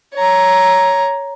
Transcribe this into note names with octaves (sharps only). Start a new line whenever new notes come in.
C#5 A#5